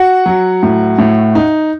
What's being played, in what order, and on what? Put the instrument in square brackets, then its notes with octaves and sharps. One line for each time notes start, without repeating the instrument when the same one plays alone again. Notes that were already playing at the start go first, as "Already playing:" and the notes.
Already playing: [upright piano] F#4 F#5
F#3
A2
A2
D#4